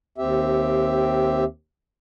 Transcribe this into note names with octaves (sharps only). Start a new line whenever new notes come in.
D#2 C4 G4 E5